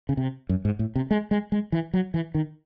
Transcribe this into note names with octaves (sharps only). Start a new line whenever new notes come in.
C#3
C3
F#2
G#2
A2
C3
G#3
G#3
G#3
E3
F#3
E3
D#3